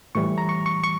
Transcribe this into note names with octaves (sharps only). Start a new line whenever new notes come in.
A2 E3 G3 C#6
A#5
C#6
C#6
C#6